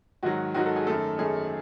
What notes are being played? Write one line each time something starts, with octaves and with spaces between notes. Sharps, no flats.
G#2 D#3 F#3 F#4
G#2 D#3 F#3 F#4
A4
G#4
F#2 D#3 A3 A4
F#2 D#3 A3 G#4